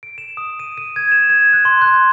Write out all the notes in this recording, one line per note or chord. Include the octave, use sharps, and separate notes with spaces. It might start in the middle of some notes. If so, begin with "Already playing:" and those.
D7
E7
D#6
D#7
D#7
G#6
E7
G#6
F#6
C6
F#6
G6